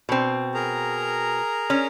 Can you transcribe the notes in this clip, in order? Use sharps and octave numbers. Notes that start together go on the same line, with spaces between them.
B2 C4
G#4 A#4 A#5
C#4